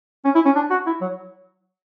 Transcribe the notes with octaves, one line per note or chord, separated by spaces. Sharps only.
C#4
E4
C#4
D4
F#4
E4
F#3